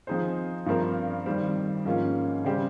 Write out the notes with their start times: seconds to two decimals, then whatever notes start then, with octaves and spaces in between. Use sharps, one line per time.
0.07 F3 C4 D#4 G#4 C5
0.66 G2 F3 C4 F4 A#4
1.26 F2 D#3 G3 C4
1.85 G#2 F3 A#3 C#4 F4
2.44 C#3 G3 C4 G4